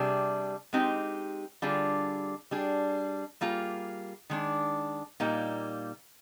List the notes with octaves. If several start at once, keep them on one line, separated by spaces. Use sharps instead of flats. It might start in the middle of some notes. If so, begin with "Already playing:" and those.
Already playing: C3 G3 D4 G#4
G#3 C4 D#4 G4
D3 G3 D4 F4 G#4
G3 D4 G#4
G3 A#3 F4 G#4
D#3 G#3 D4
A#2 G3 A#3 D#4